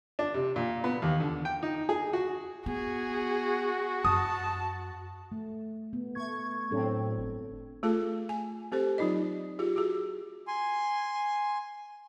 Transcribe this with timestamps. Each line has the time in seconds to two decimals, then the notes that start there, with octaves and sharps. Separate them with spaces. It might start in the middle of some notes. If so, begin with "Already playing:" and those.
0.19 D4
0.34 C3
0.56 A#2
0.84 B3
1.02 D#2
1.20 D3
1.45 G5
1.63 D#4
1.89 G#4
2.13 F#4
2.66 B3 F#4 G#4
4.05 F#2 A5 D#6
5.32 A3
5.93 B3
6.15 A3 C#6 G#6
6.71 A2 F#3 C4 D4 A4
7.17 G1
7.83 A3 F4 G#4 A4 A5
8.29 G#5
8.72 C4 G4 A4 C5
8.98 F#3 C4 D#4 F4 D#5
9.59 F4 G4 G#4
9.76 F#4 G#4
10.47 G#5 C6